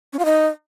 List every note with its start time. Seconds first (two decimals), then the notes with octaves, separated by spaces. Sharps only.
0.13 C#4
0.19 F4
0.25 D#4